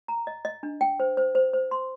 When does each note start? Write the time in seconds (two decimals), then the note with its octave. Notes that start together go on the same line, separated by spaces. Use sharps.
0.08 A#5
0.27 D#5
0.45 D#5
0.63 D4
0.81 G5
1.00 C5
1.17 C5
1.35 C5
1.53 C5
1.71 C6